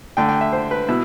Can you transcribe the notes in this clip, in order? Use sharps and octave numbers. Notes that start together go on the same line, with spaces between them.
D3 A3 G5
G5
E5
C5
B4
B2 E4